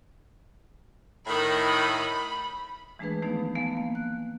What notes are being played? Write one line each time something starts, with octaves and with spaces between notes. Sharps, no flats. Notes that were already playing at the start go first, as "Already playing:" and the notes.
A2 D#3 B5
E3 G#3 A3 D4 G#4 B4
D#3 F3 A3 B3 D4 D#4
A3 B3 F5 G#5
A#3
F#6